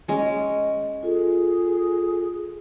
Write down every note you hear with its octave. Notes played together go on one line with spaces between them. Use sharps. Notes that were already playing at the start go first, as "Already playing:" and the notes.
G#3 C#4
F4 G#4 A4